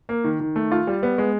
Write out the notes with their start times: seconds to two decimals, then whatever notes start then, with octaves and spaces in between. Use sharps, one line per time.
0.09 A#3
0.24 D#3
0.40 D#3
0.56 A3
0.72 F4
0.87 G3
1.03 B3
1.18 G#3